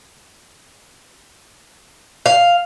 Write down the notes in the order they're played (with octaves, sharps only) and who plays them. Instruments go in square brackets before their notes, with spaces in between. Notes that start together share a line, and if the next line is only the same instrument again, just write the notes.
[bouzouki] F5